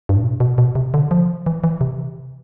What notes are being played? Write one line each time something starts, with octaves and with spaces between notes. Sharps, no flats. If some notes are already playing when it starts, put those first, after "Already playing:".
G2
A2
B2
B2
B2
C3
D3
F3
E3
E3
C3